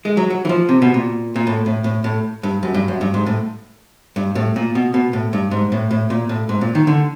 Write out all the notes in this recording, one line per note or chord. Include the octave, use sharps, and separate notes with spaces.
G#3
F#3
F#3
E3
F3
C3
B2
A#2
A#2
A2
A2
A2
A2
G2
F#2
G2
F#2
G2
G#2
A2
G2
A2
A#2
B2
B2
A2
G2
G#2
A2
A2
A#2
A2
G#2
A#2
D#3
D3